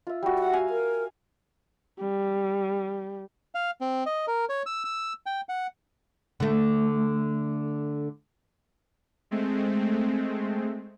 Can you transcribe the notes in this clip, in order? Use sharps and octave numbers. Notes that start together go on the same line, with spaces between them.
F4 E5
G3 F#4
F#5
F5 G#5
A#4
G3
F5
C4
D#5
A#4
C#5
E6
E6
G5
F#5
D3 A3
G#3 A3 C4